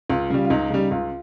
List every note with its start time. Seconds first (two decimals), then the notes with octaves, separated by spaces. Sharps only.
0.10 C#2 F4
0.30 C#3 G3
0.45 F4
0.50 C#2 D#4
0.70 C#3 G3
0.91 C#2 F4